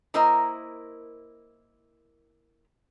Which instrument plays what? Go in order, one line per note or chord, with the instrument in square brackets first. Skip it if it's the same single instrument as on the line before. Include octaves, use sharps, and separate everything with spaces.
[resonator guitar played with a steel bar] A#3 E4 A#4 C5 D#5